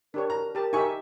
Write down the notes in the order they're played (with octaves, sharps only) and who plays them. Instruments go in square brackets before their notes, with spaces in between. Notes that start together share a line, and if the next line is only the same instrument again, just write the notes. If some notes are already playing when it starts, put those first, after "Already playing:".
[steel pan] D4 G4 C#5 [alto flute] A#4
[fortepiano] A#5
[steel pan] G4 A5 [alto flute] A#4
[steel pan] D#4 G4 E5 [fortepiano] G#5 C#6